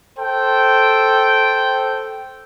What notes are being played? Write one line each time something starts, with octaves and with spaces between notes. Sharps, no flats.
A4 C5 G5